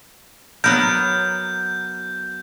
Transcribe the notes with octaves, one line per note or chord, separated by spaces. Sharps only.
F#3 B3 A#4 G6